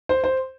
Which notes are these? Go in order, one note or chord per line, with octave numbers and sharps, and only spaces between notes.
C5
C5